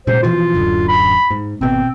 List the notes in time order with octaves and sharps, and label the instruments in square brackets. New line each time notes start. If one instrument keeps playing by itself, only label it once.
[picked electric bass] A#2 C#3 G#3 [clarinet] C5
[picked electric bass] B2 E3 F3 [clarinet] F4
[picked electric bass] D1 F#2 D3
[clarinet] B5
[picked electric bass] G#2
[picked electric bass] G#1 B2 [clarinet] C4